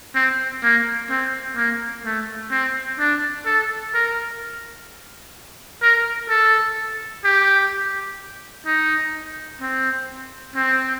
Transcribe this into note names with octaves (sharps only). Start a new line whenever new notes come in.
C4
A#3
C4
A#3
A3
C4
D4
A4
A#4
A#4
A4
G4
D#4
C4
C4